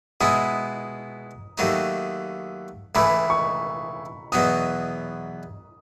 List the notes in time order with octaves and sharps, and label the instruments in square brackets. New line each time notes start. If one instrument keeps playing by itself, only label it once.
[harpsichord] B2 G#3 B3 E4 [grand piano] D#6
[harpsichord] D#2 D#3 F#3 A3 D#4
[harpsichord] C#2 C#3 E3 A3 [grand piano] B5
[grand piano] C#6
[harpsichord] E2 B2 F#3 B3 D#4 [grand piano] D#6